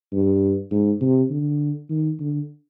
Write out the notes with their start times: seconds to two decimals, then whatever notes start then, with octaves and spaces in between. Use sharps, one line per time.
0.13 G2
0.72 G#2
1.01 C3
1.30 D3
1.90 D#3
2.20 D3